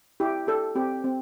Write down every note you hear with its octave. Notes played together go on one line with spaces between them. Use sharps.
E4 G4
G4 A4
C4 G4
C4